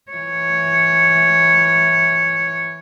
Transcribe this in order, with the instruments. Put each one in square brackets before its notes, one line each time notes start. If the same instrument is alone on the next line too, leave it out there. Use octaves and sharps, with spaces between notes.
[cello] E3 C#5